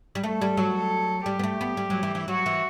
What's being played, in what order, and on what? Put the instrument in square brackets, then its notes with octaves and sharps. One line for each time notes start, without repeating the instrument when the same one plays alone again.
[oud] G3
[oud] A3 [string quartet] A4
[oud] G3
F#3
[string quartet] A4
[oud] G3 [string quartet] G4
[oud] B3
A3
B3
G3
F#3
E3
E3
[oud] F#3 [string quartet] F#4
[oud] E3